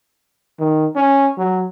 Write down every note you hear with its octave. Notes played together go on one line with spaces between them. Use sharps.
D#3
C#4
F#3